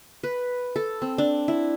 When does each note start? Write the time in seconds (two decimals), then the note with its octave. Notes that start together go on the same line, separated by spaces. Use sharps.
0.23 B4
0.76 A4
1.02 C4
1.18 D4
1.48 E4